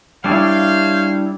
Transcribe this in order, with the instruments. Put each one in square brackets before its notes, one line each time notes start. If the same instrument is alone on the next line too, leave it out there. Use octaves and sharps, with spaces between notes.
[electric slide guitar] G3 D4 E4 [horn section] C5 C#5 F5